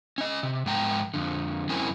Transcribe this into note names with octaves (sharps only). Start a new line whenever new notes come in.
C#4 D#5
C3
G#2 F3 G5 A5 A#5
F2 D3
F#2 C4 C#4 E4 A#4 G#5